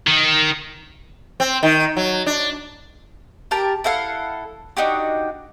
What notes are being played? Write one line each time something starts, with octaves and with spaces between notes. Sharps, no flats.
D#3
C4
D#3
F#3
D4
G4 A#4 A5
E4 A4 F5 F#5
D4 D#4 F#4 G4